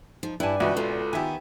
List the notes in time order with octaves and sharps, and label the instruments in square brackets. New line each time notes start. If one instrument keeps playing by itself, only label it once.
[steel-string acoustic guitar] F3 [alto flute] D#4
[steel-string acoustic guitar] G2 [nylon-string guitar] E4 A5 [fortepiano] B4 G#5 [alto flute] D5
[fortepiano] C#2 F#4 B4 [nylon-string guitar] E3
[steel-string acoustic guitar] E2 A#2 [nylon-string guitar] F4 [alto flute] A4
[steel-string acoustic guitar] D#3 B3 [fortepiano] G4 E5 G#5